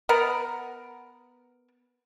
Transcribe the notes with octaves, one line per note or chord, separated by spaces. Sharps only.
B3 A#4 F#5